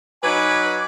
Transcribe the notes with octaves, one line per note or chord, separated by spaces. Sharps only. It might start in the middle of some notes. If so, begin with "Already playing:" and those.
F#3 D#4 B4 G#5 D6